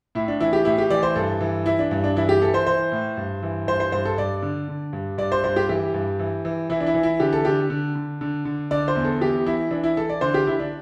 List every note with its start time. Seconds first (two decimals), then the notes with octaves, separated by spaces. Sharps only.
0.15 A2 E4
0.28 D4
0.40 E3 E4
0.53 G4
0.65 A2 E4
0.78 G4
0.90 E3 D5
1.03 C5
1.16 G2 A4
1.41 E3
1.66 E3 E4
1.79 D4
1.91 G2
2.04 D4
2.16 E3 E4
2.29 G4
2.42 E3 A4
2.54 C5
2.67 E3 C5
2.92 A2
3.17 G2
3.43 E3
3.67 G2 C5
3.80 C5
3.92 G2 C5
4.05 A4
4.18 G2 D5
4.42 D3
4.68 D3
4.93 G2
5.18 G2 D5
5.32 C5
5.44 G2 C5
5.56 G4
5.69 E3 G4
5.94 G2
6.19 E3
6.45 E3
6.70 E3 E4
6.80 D4
6.86 E4
6.94 E3
7.03 E4
7.20 D3 G4
7.33 A4
7.45 D3 G4
7.70 D3
7.95 D3
8.21 D3
8.45 D3
8.71 D3 D5
8.88 C5
8.95 E2
9.05 A4
9.21 E3 G4
9.46 E3 E4
9.71 E3 D4
9.84 E4
9.97 E3 A4
10.09 D5
10.21 D3 C5
10.34 G4
10.47 D3 E4
10.60 D4